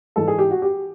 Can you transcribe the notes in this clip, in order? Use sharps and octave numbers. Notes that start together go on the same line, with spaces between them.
G#2 E3 A4
G#4
G4
F#4
G4